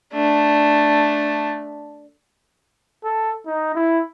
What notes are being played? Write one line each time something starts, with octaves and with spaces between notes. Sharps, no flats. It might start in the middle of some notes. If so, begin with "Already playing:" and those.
A3 D4
A4
D#4
E4